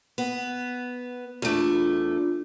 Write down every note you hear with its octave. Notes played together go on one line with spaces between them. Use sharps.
B3
E2 A3 D4 F4